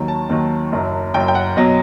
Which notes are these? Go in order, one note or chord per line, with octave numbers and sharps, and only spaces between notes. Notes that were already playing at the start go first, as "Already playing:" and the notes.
Already playing: D#2 D#3 F#3
A5
D#2 D#3 F#3
F#1 F#2 F#3
F#1 F#2 F#3 G5
G5
F#5
B1 B2 F#3 D#5